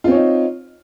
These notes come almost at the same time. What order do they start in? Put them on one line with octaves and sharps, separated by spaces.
F4 C4 C#5 D#4